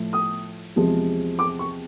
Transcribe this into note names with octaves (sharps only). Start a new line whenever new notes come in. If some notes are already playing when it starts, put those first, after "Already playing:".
Already playing: A2 F3 A3
D#6
E2 C3 F3 G#3
D6
C#6